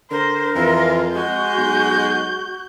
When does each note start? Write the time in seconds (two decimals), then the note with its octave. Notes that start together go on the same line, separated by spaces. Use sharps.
0.11 D3 A#4 C5
0.55 F2 E3 F4
1.14 G#3 F#4 G6
1.58 B1